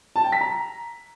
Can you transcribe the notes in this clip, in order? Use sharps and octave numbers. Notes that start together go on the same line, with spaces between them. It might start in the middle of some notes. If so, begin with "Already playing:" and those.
A5
G5
B6
A#5